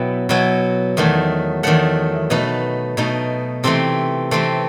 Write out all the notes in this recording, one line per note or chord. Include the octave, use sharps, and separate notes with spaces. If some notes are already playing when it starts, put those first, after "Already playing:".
Already playing: B2 F#3 B3 E4 G5
B2 F#3 B3 E4
E2 D#3 F#3 A3
E2 D#3 F#3 A3 F#5
B2 A3 D#4 B4
B2 A3 D#4
C3 E3 A3 C4 A4
C3 E3 A3 C4